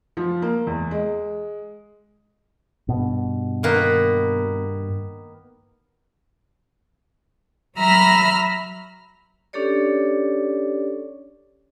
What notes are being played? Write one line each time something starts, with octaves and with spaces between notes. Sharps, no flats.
F3
A#3
E2
G#3
G2 B2
D#3 A#3 B3
F#3 E5 A#5 B5 F6 A#6
C#4 D4 G4 A4 C#5 D5